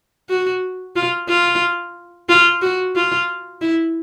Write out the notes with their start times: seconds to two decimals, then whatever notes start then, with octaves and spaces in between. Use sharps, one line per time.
0.29 F#4
0.96 F4
1.28 F4
2.29 F4
2.62 F#4
2.96 F4
3.61 E4